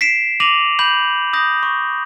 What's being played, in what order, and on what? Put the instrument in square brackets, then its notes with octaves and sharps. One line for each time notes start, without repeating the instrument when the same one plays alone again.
[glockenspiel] B6 C7 D7 E7
D6 A#6 D#7 F7 F#7
B5 G6 F#7
D#6 G6 A#6
C#6